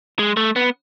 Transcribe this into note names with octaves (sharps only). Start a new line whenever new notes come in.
G#3
A3
B3